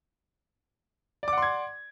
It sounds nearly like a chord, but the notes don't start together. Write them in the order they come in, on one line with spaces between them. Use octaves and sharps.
D5 D6 F#5 C6 G#6